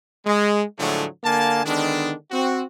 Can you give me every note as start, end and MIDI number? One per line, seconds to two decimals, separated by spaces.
0.25 0.63 56
0.78 1.06 45
0.78 1.06 50
0.78 1.06 53
0.78 1.06 54
0.78 1.06 56
0.78 1.06 57
1.23 1.64 50
1.23 1.64 58
1.23 1.64 77
1.23 1.64 80
1.23 1.64 81
1.65 2.13 50
1.65 2.13 51
1.65 2.13 56
1.65 2.13 59
1.65 2.13 62
2.31 2.63 60
2.31 2.63 66